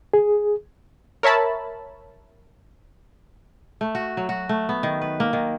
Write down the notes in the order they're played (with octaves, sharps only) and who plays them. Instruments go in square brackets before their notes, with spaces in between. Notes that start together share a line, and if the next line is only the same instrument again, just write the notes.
[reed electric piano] G#4
[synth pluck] A#4 C#5 E5 A5 B5
[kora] A3
F#4
F#3
F#4
A3
B3
D#3
B4
A#3
D#3